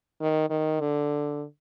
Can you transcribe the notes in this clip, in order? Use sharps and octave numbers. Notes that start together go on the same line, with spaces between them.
D#3
D#3
D3